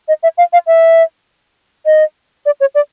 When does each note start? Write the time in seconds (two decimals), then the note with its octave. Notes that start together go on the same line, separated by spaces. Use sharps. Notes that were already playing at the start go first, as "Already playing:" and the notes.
0.08 D#5
0.23 E5
0.38 F5
0.53 F5
0.67 E5
1.86 D#5
2.46 D5
2.60 C#5
2.75 D5